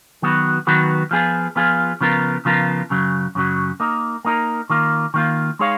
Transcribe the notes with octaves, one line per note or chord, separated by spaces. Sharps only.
D#3 F#3 B3 F#4 B4
D#3 F#3 B3 F#4 B4
F3 B3 F4 G#4
F3 B3 F4 G#4
C#3 F3 B3 F4 A#4
C#3 F3 B3 F4 A#4
F#2 C#3 F#3
F#2 C#3 F#3
A#3 D#4 A#4
A#3 D#4 A#4
D#3 A#3 F4
D#3 A#3 F4
G#3 D#4 G#4 C#5 F5